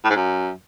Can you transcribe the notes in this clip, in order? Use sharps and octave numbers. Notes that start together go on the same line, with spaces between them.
A2
G#2
F#2